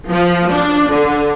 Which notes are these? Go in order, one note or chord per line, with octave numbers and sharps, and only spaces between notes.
F3
D4
D3